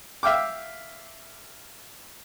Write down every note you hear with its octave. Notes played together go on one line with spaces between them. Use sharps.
E5 F5 G5 D6